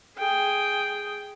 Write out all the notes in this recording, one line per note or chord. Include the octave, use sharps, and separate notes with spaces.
G#4 G5